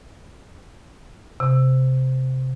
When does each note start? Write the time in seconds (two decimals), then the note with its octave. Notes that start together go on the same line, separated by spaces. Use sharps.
1.40 C3